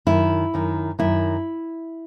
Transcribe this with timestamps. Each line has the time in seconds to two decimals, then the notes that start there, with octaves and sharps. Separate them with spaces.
0.06 F#2 D#3 E4
0.54 F#2 D#3
0.99 F#2 D#3 E4